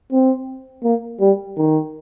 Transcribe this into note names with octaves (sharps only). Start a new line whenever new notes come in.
C4
A#3
G3
D#3